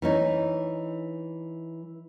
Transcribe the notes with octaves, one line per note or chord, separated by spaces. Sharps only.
E3 C#4 D#4